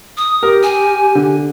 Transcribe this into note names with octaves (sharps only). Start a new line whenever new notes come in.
D#6
G4 A#4
G#5
D3